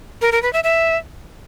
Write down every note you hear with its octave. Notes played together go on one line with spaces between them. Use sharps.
A#4
A#4
B4
E5
E5